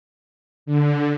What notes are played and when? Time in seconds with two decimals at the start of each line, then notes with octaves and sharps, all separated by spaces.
0.66 D3